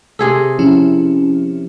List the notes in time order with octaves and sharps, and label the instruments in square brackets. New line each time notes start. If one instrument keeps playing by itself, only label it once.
[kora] C3 G#4 A4
[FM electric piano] F3 C#4 E4